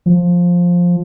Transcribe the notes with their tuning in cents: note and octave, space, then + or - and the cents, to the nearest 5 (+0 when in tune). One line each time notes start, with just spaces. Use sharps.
F3 +10